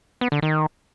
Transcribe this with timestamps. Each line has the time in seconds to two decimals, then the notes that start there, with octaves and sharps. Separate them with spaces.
0.21 B3
0.32 D3
0.42 D#3